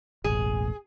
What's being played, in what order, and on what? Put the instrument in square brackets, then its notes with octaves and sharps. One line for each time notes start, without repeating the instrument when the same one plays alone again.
[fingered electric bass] E1 A1 [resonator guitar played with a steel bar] G#4